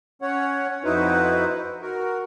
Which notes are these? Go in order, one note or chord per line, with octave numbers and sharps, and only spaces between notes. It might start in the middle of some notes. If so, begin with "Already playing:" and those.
C#4 C#5 F#5
F2 D#4 E4 F#4 B4 C5
F#4 A#4